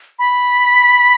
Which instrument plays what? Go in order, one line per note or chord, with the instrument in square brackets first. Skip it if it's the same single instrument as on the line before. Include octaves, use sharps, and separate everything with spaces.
[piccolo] B5